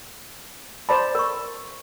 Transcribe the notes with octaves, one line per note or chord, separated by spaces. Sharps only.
C5 D5 A5 B5
A#4 C#6